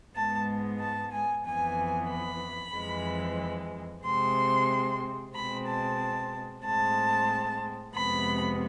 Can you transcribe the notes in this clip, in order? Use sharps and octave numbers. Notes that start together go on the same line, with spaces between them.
G#2 G#3 B3 A5
A5
G#5
F2 E3 B3 G#5
B5
F2 E3 G#3
C3 G#3 C4 C6
B2 G#3 C4 B5
A5
A2 G#3 C4 A5
F2 C3 G#3 B3 B5